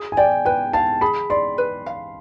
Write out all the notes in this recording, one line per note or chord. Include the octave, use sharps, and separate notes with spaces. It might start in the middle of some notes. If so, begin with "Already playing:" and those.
Already playing: G#4
G#5
D5 G5
B4 G5
F5 A5
G#4 B5
D5 C6
B4
F5